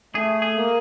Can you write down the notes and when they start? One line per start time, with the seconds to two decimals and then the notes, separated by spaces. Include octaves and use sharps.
0.15 A3 G#4
0.42 G#4
0.56 A#3